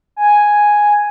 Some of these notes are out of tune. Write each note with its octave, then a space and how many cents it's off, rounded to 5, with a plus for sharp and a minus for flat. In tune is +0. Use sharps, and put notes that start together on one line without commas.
G#5 +0